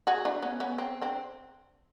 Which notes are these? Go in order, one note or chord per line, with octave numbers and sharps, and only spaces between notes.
F#4 G#4
D4 E4
B3 C#4
B3 C#4
C4
C4 D4